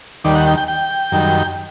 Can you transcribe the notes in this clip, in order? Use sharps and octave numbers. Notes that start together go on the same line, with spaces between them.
D#2 D#3 G3 D5
F#5
G5
G5
G5
F#2 D#3 G3